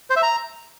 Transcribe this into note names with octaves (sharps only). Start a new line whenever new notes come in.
C5
E5
A#5